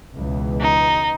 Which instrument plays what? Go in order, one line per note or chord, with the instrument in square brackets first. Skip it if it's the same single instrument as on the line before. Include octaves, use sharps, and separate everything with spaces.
[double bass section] C#2 B2 E3
[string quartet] D#4